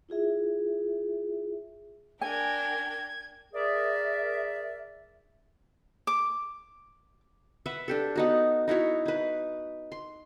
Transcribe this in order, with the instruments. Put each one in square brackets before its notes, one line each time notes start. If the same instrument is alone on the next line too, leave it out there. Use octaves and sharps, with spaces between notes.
[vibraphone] E4 F4 G#4 E5
[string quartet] D4 A#4 G5 [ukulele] G#5 [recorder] G#6
[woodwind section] G#4 A#4 D5 E5
[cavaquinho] D6
[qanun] B4 E5 F#5
D4 G4 A4
B3 D#4 F#4
D#4 E4 F#4 C#5
D#4 B4
C6